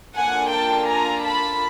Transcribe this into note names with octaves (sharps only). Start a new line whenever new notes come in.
A#3 D4 F4 A4 F#5 G#5
G5 A5
G#5 A#5
A5 B5